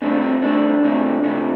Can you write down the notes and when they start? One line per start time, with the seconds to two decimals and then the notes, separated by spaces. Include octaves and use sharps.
0.02 C2 C3 A3 C4 D4
0.21 C4
0.41 C2 C3 A3 C4 D4
0.83 C2 C3 A3 C4
1.23 C2 C3 A3 C4